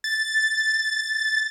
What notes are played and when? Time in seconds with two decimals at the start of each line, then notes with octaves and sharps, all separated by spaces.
0.04 A6